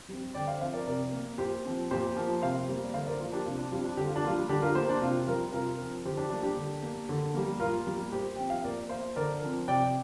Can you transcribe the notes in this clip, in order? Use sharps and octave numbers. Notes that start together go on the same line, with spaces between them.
G3 C4
D3 D5 G5
C5 F5
F3 C4 C5 F5
A#4 D5
C3 A#4 D5
A#3
A#2 G4 C5
F3 C4
A#2 G4 C5
F3 A#3
C3 C5 F5
G3 A#3
D5
D3 C5 F5
A#4 D5
C5
F3 A#3 F4 A#4
D4 G4
C3 F4
D4
G3 C4 F4
D4
D3 G4
F4
D4
G3 A#3 F4
D3 D4 G4
F4 A#4
A#3 G4 C5
D4
C3 F4
G3 C4 F4 A#4
C3 F4 A#4
F3 C4
D3 G4 C5
D4 G4
G3 A#3 D4
D4 G4
D3
A#3
D3
G3 A#3
A#2 F4 A#4
G3 A#3
A#2 G4 C5
F3 C4 G5
F5
A#2 A#4 D5
A#3 C5 F5
D3 A#4 D5
F3 C4
C3 D5 G5